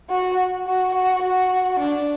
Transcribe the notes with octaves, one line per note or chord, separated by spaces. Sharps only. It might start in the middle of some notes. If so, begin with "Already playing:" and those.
F#4
F#4
F#4
F#4
D4